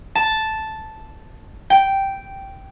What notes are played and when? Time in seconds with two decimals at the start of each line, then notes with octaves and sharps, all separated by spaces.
0.15 A5
1.70 G5